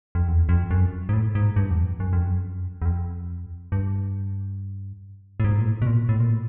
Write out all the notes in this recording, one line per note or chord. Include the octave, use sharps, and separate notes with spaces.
F2
E2
F2
F#2
G#2
A2
G#2
G2
E2
F2
F#2
F2
F#2
E2
F2
G2
A2
G#2
A#2
A2
B2
A#2
A2
A#2
A2